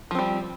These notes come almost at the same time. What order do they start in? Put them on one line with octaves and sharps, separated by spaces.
F3 C4 G3